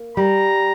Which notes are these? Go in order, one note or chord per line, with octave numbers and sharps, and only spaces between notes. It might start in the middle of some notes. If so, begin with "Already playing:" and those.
Already playing: A#3
G3 A#5